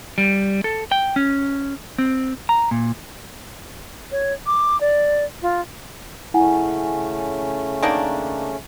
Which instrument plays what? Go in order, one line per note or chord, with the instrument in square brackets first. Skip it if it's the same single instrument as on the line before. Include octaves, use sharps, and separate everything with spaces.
[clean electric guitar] G3
A4
G5
C#4
C4
A#5
A#2
[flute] C#5
D6
D5
F4
[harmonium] C#3 A3 C#4 [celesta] E4 F#5 G#5
[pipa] D#3 A#3 D4